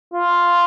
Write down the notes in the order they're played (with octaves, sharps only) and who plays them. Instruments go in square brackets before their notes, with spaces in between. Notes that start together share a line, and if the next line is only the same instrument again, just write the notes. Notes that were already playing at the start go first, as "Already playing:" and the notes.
[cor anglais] F4